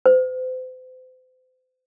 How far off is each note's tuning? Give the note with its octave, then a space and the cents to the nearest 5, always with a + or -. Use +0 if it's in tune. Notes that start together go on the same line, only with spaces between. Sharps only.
C5 -40